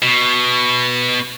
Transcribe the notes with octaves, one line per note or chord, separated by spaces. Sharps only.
B2